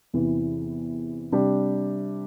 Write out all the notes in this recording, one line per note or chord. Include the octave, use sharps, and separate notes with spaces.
E2 C3 E3
C3 G3 D4 G4